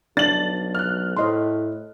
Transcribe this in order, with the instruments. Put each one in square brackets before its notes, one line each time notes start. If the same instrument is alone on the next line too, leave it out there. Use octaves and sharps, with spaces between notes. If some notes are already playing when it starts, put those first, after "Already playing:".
[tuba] B1 [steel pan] D4 [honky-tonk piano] A6 F#7
[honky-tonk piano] F6 F#6
[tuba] A2 [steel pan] C5 D#5 C6